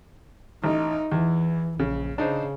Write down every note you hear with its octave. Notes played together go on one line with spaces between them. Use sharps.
A1 D#4
E2 E3
A#1 C#3
C#3 D4 D#4 C5